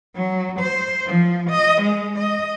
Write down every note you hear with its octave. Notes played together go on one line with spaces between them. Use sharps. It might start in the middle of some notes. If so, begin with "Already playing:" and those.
F#3
C5
F3
D#5
G#3
D#5